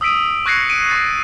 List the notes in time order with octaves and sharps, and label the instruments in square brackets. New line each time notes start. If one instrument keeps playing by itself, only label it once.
[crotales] D#6 E6 B6 D7 D#7
C#6 F#6 G#6 A#6 C7 C#7
D7 D#7
C#6 A6 C7